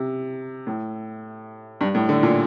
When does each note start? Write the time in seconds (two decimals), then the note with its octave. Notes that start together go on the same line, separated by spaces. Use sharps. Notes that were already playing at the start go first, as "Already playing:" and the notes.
Already playing: C3
0.67 A2
1.81 G2
1.95 A2
2.09 D3
2.23 A#2